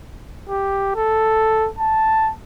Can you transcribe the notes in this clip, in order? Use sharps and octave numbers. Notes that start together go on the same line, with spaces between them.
G4
A4
A5